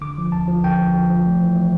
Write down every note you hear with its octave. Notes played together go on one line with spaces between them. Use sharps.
D3 D6
F3
D2 A5
F3
D3 G5
F3
F3
F3
A3
E3
A3